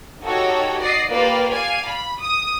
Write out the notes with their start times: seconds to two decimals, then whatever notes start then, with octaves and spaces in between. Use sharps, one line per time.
0.22 D#4 F#4 G4 A4 C#5
0.80 D5 D#5 C7
1.11 A#3 F4 G4 B4 D5 F5
1.51 D5 F5 G#5
1.87 B5
2.20 D#6